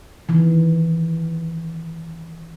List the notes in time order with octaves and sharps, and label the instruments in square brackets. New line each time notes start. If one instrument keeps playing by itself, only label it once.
[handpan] D#3 E3